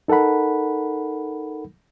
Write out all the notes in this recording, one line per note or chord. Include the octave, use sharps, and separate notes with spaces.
D#4 A4 A#4 F#5 B5